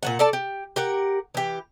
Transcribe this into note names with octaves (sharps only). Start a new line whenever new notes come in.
A#2 F#3 F#5
A4 D5 A5
G4
G4 A#4 F#5
E3 G4